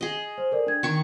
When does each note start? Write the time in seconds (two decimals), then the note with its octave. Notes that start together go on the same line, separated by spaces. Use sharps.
0.01 G#4 D#5
0.38 C5
0.52 A4 A#4 D5
0.67 D4 G#6
0.83 D#3 C#6